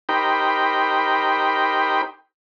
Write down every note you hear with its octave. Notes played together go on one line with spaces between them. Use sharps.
D#4 G4 A#4 C5 G5 B5